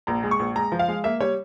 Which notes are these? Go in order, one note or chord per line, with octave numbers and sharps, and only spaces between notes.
A#1 A#5
G#3
C#6
A#1
G#3 A#5
F3
F5
G#3
A#3 E5
G3 C#5